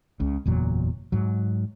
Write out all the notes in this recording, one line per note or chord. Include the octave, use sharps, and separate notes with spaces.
C#2 C#3
F#1 E2 A#2 F#3
G#2 F#3